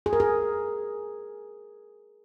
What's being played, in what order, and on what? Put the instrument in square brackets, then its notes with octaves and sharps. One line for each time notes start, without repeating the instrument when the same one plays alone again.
[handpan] G#4
A#4
G#4